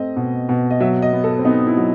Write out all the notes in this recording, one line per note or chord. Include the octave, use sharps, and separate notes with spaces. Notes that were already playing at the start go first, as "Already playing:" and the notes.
Already playing: A3 C4 D#5
B2
B2
D#5
F#3 E5
D#5
B3
A4
C4
B3 D#4
E4
F#3